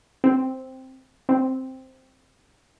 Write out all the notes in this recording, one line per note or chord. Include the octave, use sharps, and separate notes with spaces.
C4
C4